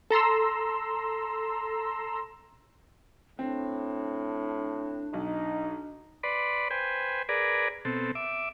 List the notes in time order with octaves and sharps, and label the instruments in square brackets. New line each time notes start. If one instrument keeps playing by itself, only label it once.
[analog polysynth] A4 A#5 C6 E6
[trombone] A2 [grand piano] C4 [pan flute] D4
[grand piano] B1 [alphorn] D#4
[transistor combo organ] B4 D5 B5 C6
B4 C5 G5 G#5
G#4 A#4 B4 D5
B2 C4 A4
E5 D6